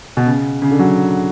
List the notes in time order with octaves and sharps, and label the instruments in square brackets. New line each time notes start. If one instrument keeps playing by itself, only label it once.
[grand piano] B2
C#3
C#3
D3
F#3